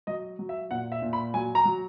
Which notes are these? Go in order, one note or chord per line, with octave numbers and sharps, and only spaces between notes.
F#3 D#5
F#3
E5
A#2 F#5
E5
A#2
B5
F#3 G#5
A#5
F#3